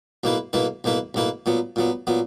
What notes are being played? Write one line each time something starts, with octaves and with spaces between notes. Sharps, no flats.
B1 B2 A#3 E4 B4
B1 B2 A#3 E4 B4
B1 B2 A#3 E4 B4
B1 B2 A#3 E4 B4
A#2 F#3 B3
A#2 F#3 B3
A#2 F#3 B3